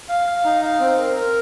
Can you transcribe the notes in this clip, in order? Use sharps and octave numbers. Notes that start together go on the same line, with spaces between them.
F5
F5
D#4
F5
C4
A#4
A#4